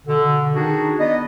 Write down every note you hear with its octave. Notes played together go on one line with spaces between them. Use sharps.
B2 D3
D#3 D4 D#4 F#4 G#4
B3 D5 D#5